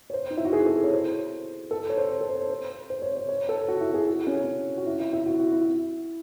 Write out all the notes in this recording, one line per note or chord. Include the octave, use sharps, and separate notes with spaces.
C#5
C5
D#4
E4
F#4
G#4
A4
C#5
C5
A4
C#5
C5
C#5
A4
C5
C5
C5
C#5
C#5
C#5
A4
F#4
E4
G#4
F#4
C#4
F#4
E4
E4
E4
F#4
F#4
E4